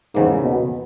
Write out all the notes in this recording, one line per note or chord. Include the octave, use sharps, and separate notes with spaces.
E2 G#2 C#3 E3 G3 A#3
B2